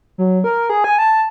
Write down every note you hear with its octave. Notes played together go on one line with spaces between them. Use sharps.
F#3
A#4
G#4
G#5
A5